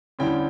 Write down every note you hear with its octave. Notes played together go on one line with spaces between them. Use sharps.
D2 D3 G3 C#4 E4 G5